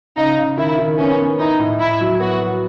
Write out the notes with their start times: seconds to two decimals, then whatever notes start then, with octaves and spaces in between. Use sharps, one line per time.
0.17 C#3 D#4
0.38 C#3
0.58 D#3 E4
0.79 D#3
0.99 B3 C#4
1.20 B3
1.39 D#4 E4
1.59 A2
1.80 A2 E4
2.01 F#3
2.20 B3 F#4
2.41 B3